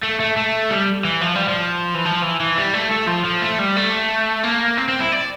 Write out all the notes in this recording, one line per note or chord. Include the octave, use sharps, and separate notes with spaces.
A3
A3
A3
G3
E3
F3
G3
F3
E3
F3
E3
E3
G3
A3
A3
F3
F3
A3
G3
A3
A#3
C4
C4
E4
D5